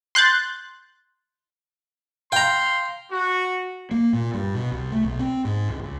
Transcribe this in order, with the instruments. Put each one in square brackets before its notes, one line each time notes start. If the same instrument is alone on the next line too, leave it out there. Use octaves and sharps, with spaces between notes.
[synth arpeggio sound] C6 F#6 G6 A6
[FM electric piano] F5 [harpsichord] G5 A#5 [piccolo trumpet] C6
[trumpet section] F#4
[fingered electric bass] A#3
A#2
G2
B2
C2
A3
B1
C4
G#2
C#2
C#2